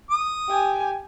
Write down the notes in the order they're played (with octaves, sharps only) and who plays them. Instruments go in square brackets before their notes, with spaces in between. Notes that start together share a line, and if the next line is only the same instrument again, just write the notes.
[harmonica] D#6
[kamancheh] G4 G#5